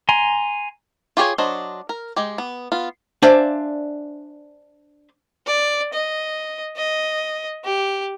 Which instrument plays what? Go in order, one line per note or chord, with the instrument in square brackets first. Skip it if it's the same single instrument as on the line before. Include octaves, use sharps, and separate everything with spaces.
[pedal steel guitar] G#5 A#5 C6
[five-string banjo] F4 G4 G#4 C#5 G#5
F#3 D4 C5 D#5
A#4
G#3 G4
B3
B3 F4
[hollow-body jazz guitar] D4 C5 D5 E5 F5 G#5
[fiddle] D5
D#5
D#5
G4